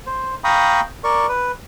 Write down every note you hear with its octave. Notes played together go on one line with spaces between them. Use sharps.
C5
F5 G5 A#5 B5 C#6 D#6
A#4 D5 C#6
B4